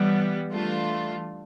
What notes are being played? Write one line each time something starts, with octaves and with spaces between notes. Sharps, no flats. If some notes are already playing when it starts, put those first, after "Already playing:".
Already playing: E3 G3 B3
E3 A3 D4 F4